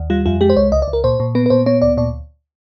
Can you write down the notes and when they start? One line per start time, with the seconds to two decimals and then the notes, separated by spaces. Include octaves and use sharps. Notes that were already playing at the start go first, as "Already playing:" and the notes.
Already playing: D#2
0.10 G3 F4
0.26 F2 F4
0.41 G#3 G4
0.50 C5
0.56 C2 C#5
0.72 C#2 D#5
0.82 D5
0.88 C#2
0.93 A#4
1.04 A#2 C5
1.20 A#2
1.35 B3 B4
1.46 B4
1.50 A#2 C5
1.66 B3 C#5
1.82 D2 D5
1.97 A#2 D5